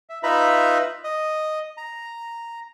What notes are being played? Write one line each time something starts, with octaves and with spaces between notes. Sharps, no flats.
E5
D#4 F4 B4 E5 A#5 B5
D#5
A#5